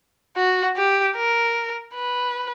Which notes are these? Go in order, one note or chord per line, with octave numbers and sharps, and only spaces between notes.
F#4
G4
A#4
B4